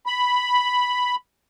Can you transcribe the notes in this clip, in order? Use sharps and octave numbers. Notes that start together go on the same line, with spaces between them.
B5